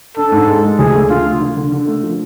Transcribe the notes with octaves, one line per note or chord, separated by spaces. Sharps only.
D4 A4
G#2
G#3
G#3
D2 G#4
A3
D3 F4
A3
D3
D3
D3
A3
F3